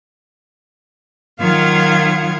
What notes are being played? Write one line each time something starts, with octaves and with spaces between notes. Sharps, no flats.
D#3 F#3 F4 F5 F#5 G#6